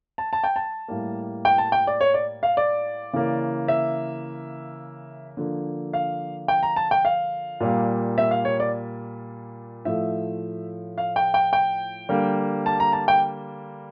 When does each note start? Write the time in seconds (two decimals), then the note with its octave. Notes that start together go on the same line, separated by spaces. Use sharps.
0.18 A5
0.33 A5
0.44 G5
0.56 A5
0.88 A2 G3 A#3
1.45 G5
1.58 A5
1.72 G5
1.87 D5
2.01 C#5
2.14 D5
2.43 F5
2.57 D5
3.13 C#3 E3 A#3
3.68 E5
5.37 D3 F3 A#3
5.93 F5
6.48 G5
6.63 A#5
6.76 A5
6.91 G5
7.05 F5
7.60 A#2 G3 A#3
8.18 E5
8.31 F5
8.45 C#5
8.60 D5
9.85 A2 F3 A3 E5
10.98 F5
11.16 G5
11.34 G5
11.53 G5
12.09 D3 G3 A#3
12.66 A5
12.80 A#5
12.93 A5
13.08 G5